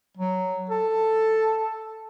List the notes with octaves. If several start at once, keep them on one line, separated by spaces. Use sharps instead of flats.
F#3
A4